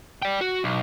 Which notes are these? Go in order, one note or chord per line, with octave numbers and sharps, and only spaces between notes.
D5 G5
F#4
B1